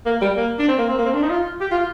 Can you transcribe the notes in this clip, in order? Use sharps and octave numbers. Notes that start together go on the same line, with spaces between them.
A#3
G3
A#3
D4
C4
A#3
C4
A#3
C4
D4
D#4
F4
G4
F4